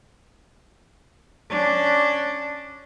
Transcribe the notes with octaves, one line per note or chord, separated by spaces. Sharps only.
C#4 D4